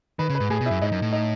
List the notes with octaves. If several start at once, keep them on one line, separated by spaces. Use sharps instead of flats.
D#3 B4
C#3
B4
G#2
A2 G#4
B2
F#2 E4
G#2 D#4
F#2
A2
D#4